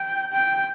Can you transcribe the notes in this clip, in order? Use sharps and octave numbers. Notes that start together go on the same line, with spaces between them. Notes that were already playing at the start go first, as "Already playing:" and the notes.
Already playing: G5
G5